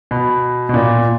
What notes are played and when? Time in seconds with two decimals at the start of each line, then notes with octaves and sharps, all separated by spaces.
0.11 B2
0.69 B2
0.74 A#2